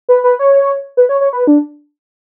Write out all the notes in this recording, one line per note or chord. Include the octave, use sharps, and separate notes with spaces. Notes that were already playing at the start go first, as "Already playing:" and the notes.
B4
B4
C#5
B4
C#5
C#5
B4
D4